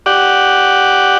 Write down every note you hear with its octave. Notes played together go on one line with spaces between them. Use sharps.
G4 D5 F#5